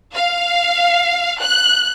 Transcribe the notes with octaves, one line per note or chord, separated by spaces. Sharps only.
F5
F#6